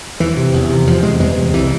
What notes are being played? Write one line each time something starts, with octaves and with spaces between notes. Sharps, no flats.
E2 E3
C3
E2
C3
E2 F3
C3 G#3
E2 G#3
C3
C2 E3